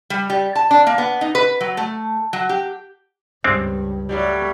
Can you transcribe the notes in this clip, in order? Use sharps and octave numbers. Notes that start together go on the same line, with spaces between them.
G3
G3
A5
D4
A#3
B3
D#4
B4
F#3
A3
F#3
G4
C#2 G2 G#3 C4 D4
A2 F#3 G3